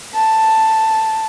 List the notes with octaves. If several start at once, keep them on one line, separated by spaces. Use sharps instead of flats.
A5